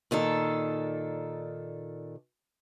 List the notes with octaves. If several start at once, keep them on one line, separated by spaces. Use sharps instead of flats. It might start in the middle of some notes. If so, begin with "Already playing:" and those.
A#2 D#3 D4 A4